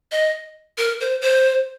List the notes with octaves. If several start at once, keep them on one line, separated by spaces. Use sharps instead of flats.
D#5
A#4
C5
C5